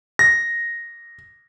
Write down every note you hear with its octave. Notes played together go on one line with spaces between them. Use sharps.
A#6